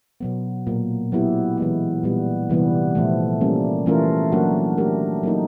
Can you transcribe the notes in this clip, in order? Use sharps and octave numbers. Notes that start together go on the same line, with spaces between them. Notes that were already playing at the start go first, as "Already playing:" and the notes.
B2 F#3 B3
A#2 F#3 A#3
F#3 B3 E4 G4
E3 G#3 B3
A#2 G3 B3
C3 E3 G3 B3
A#2 F3 A3
G3 A#3 C#4
E3 A3 C#4 F4 A#4
F#3 A#3 D4 F#4
A3 D4 G4 A#4
F#3 A#3 D#4